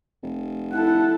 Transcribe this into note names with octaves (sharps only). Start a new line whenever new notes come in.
F1
E4 A4 F#5